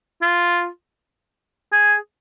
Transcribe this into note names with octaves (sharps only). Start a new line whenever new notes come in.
F4
G#4